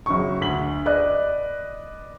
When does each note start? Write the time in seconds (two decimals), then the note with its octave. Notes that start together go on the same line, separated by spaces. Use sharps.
0.06 F#1 F#3 C#6
0.41 D2 B6 F#7
0.86 B4 D5 D#5 F#6